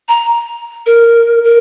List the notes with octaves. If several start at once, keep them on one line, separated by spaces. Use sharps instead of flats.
A#5
A#4
A#4